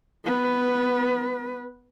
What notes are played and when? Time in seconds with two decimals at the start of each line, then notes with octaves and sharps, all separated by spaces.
0.25 B3 B4